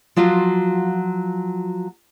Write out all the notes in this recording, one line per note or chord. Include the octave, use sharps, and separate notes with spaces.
F3 F#3 F4 F#4